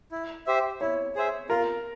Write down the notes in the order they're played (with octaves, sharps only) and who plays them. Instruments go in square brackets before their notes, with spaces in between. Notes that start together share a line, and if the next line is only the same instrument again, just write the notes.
[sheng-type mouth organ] E4
G4 C5 E5
[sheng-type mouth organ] E4 [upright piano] C#5
[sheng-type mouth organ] G#4 C5 E5
[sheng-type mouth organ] F4 [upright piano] A#4